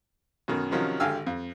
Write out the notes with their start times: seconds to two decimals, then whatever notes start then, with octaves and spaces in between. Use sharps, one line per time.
0.48 F#2 B2 D#3
0.71 C3 D#3 F3 F#3 C#4 D#4
1.00 G#1 D3 G4 F5 G#5 E6
1.26 F2